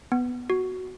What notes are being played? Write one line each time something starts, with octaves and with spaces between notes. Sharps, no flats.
B3
F#4